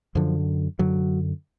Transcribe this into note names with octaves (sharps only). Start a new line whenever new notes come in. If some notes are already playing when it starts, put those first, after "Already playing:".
F#2 D3 F3
F#2 D3 F#3